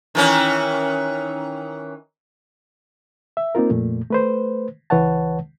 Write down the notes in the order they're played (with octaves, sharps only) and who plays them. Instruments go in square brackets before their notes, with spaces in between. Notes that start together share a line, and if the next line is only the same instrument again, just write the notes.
[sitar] D#3 E3 C#4
[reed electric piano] E5
A#3 C4 D#4 F4 A#4
F2 A#2 A3
A3 B4 C5
C#2 E3 B4 C#5 F#5 A5